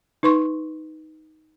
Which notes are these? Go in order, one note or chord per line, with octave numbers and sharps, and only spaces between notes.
D#4 B4 C6 C#6